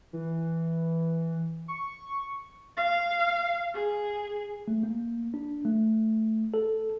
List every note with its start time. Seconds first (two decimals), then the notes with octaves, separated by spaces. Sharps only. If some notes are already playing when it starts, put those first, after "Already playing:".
0.13 E3
1.68 C#6
2.77 F5
3.74 G#4
4.68 A3
4.83 A#3
5.34 D4
5.65 A3
6.54 A4